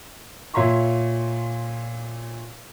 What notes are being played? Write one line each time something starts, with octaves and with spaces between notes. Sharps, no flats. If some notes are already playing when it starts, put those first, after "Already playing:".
A#2 C#5 E5 A#5 C6 C#6